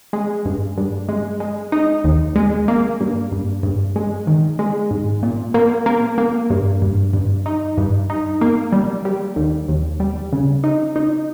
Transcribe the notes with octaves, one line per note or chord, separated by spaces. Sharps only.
G#3
G2
G2
G#3
G#3
D#4
D#2
G#3
A#3
G2
G2
G2
G#3
D#3
G#3
G#2
A#2
A#3
A#3
A#3
G2
G2
G2
D#4
G2
D#4
A#3
G3
G3
D#2
D#2
G3
C#3
D#4
D#4